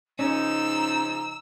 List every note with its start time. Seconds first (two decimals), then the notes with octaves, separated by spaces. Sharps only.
0.19 C#3 F3 C#4 D#4 A#5 E6